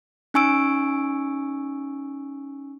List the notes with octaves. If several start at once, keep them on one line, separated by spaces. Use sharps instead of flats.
C#4 D#4 G#5 C#6 E6 D7